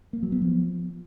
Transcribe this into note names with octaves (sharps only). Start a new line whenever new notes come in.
A#3
F#3
B3
F3